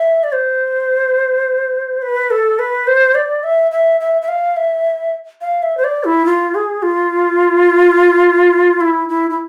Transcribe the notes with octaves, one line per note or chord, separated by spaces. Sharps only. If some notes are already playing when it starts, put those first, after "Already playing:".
Already playing: E5
D5
C5
B4
A4
B4
C5
D5
E5
E5
E5
E5
F5
E5
F5
E5
C5
D5
E4
F4
G#4
F4
E4
E4
E4